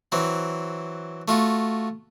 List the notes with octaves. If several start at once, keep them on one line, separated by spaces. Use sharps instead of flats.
E3 F#3 C4
A3 F4 F#4